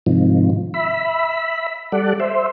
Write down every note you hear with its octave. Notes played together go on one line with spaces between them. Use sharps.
G#2 C3 D#3 F3
E5 B5
G3 A4 D5 F#5
C5 E5